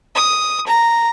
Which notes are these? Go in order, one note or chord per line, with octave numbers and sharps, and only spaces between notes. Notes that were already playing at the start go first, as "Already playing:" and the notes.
D#6
A#5